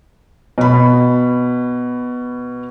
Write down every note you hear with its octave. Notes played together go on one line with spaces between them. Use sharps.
B2 B5